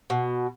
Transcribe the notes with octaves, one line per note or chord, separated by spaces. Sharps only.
B2